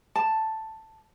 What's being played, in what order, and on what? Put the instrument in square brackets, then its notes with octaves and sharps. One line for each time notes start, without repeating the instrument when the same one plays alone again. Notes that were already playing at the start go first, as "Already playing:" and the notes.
[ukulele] A5